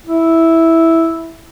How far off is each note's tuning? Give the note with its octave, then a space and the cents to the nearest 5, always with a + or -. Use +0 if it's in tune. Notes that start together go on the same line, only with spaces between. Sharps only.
E4 -5